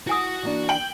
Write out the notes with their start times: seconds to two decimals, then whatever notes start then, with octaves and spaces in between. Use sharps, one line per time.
0.07 E4 F#4 F#5 G#5 D#6
0.43 E3 A#3 D4
0.69 G5 F#7